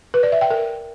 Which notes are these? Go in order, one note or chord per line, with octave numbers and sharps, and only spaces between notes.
B4
D5
E5
G5
A#4